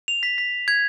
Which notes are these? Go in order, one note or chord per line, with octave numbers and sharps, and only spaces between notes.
F7
B6
B6
G#6